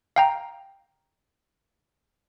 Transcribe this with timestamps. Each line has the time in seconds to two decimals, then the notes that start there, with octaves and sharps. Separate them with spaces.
0.16 F5 G5 A#5